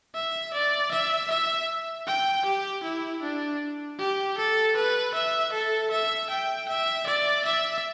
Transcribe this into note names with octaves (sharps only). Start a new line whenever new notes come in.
E5
D5
E5
E5
G5
G4
E4
D4
G4
A4
B4
E5
A4
E5
G5
E5
D5
E5